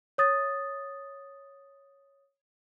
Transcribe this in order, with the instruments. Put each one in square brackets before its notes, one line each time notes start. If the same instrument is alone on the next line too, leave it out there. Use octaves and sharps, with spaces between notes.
[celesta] C#5 D#6 A6